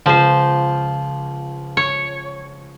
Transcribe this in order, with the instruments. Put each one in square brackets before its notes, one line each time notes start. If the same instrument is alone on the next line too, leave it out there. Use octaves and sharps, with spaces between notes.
[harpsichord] C#2 [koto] F3 C5
[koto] C#5